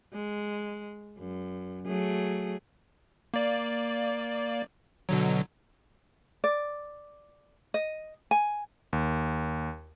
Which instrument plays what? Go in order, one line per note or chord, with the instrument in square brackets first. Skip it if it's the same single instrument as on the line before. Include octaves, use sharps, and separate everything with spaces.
[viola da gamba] G#3
F#2
F#3 A3 G#4
[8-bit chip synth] A#3 D5
B2 D3 F#3
[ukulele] D5
D#5
G#5
[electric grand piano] D#2